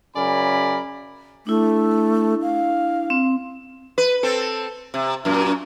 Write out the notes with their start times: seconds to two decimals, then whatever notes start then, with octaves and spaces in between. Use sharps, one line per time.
0.16 F#2 C#3 A#4 D5 G#5 B5
1.47 A3 D4 E4
2.42 F5
3.10 C4
3.98 B4
4.23 C4 A4
4.94 C3
5.25 F#2 A#2